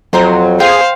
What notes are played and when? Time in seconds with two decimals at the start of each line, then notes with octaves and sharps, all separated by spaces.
0.13 F2 F#3 C5 A#5 C6
0.60 G#4 C5 F5 G5